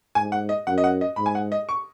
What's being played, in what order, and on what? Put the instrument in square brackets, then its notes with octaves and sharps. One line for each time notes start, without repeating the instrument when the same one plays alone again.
[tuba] G#2 [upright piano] G#5
[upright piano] F#5
D#5
[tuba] F#2 [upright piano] F#5
[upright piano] D#5
F#5
D#5
[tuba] G#2 [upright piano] B5
[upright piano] G#5
F#5
D#5
C#6